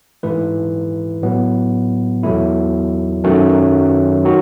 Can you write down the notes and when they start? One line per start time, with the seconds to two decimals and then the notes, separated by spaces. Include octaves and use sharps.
0.23 G#2 E3 A3 E4 B4
1.23 A2 F#3 B3
2.23 E2 B2 F#3 A3 E4
3.24 F#2 D#3 F#3 A3 C#4
4.25 D#3 F#3 F#4